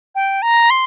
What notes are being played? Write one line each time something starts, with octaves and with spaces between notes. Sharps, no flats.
G5
A#5
C6